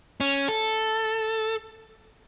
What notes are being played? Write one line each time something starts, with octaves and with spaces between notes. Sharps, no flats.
C#4
A4